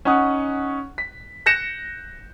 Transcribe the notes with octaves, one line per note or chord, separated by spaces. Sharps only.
C#4 D#4 F#5 D#6 F#6
B6
F#6 G6 A#6 C#7 E7